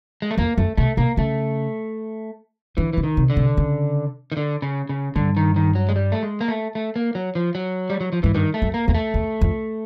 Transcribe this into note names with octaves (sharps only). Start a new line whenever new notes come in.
G#3
A3
F2 A#3
F#2 A3
B2 A3
B2 A#3
C#3 A3
D3 E3
C#3 E3
D#3
C3
D3
C3
C#3
D#3
D3
C#3
C#3
G2 D3
D#3
D#3
F#3
G#3
G3
A3
G#3
A#3
A3
A3
A#3
F#3
F3
F#3
G3
F#3
F3
G#2 E3
G2 D#3
A3
F#2
A#3
E2 A#3
A3
E2
F2